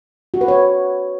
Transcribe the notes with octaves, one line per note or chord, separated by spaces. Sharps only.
F#4
B4
C#5